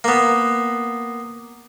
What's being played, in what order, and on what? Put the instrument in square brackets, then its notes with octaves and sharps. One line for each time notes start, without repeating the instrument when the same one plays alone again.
[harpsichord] A#3 B3